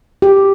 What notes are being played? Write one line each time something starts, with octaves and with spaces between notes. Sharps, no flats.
G4